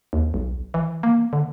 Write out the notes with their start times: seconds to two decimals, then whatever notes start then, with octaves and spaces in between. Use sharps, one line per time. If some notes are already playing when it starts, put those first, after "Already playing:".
0.13 D#2
0.34 B1
0.74 E3
1.03 A#3
1.33 D3